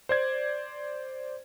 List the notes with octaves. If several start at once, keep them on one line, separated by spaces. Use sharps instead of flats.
C5 D5 G#6